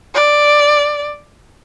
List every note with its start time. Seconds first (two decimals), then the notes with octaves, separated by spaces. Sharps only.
0.14 D5